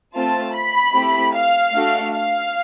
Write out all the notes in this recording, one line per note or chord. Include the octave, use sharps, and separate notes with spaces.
A3 C4 F4 A5
B5
A3 C4 E4 G4
F5
A3 D4 F#4 A4
F5